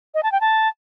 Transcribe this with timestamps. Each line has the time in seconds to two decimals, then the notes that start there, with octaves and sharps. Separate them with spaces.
0.14 D#5
0.23 A5
0.32 G5
0.41 A5